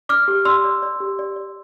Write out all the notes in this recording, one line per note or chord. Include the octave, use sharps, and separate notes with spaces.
D5 D6 F6
G4
D5 C6 E6
D5
D5
G4
D5
D5